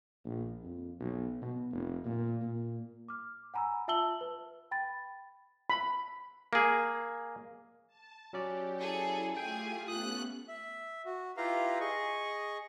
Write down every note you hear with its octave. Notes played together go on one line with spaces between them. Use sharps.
A#1
F2
B1
B2
F1
A#2
A#2
D6 F6
F#5 G#5 A#5 B5 E6
F4 E5 A5 E6 F#7 G7
B4
G5 B5 A6
B5
A#3 G#4
A5
F#3 C#4 G4 D5
E4 G#4 A4
A3 F4 G4 G#4 G5 G#5
A3 B3 C#4 D#6 F#6
E5
F#4
E4 F4 G4 B4 F5 A#5
G#4 D#5 C#6